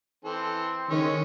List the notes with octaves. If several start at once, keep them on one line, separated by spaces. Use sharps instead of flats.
E3 C4 A4
D#3 G#3 C#4 C#6